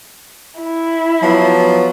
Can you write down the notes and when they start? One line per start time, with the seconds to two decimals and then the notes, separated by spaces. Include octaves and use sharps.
0.61 E4
1.23 F3 F#3 B3